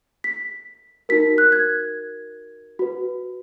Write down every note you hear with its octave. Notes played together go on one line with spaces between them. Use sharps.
B6
D#4 F#4 A#4 B6
F#6
G#6
F#4 B4